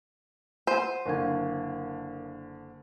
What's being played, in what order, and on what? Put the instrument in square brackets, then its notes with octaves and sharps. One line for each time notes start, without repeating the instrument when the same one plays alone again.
[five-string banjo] C5 [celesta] F#5 D#7
[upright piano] F#1 D3 [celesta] A#4 F5 G#6